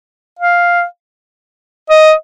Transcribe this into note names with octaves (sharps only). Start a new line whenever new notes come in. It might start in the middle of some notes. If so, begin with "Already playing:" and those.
F5
D#5